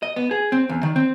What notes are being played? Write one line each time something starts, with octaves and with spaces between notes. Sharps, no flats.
D#5
B3
G#4
C4
E2
D#3
C4